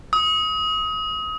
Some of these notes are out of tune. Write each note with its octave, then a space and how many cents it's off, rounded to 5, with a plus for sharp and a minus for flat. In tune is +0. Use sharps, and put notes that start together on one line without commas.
D#6 +30